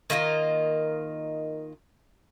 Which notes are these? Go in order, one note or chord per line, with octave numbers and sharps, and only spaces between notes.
D#3 A#3 F4 D#5